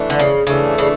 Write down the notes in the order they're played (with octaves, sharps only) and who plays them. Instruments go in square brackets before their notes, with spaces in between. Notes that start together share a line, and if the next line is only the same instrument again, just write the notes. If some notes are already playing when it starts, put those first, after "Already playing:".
Already playing: [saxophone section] E3 A3 D4
[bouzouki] D3
C#3
[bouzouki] C#3 [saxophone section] E3 A3 D4
[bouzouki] C#3